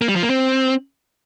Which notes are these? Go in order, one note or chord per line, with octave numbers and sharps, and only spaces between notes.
A#3
G3
F3
A#3
C4